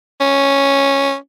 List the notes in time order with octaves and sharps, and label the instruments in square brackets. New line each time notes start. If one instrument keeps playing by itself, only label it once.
[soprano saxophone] C#4